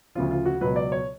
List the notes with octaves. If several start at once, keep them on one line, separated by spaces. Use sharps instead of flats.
D2 C#3 F3 F4
F4
F#4
C#2 B2 F#3 B4
D5
C#5